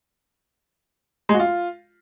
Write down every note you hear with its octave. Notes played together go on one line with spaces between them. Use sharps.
G#3
F#4
F4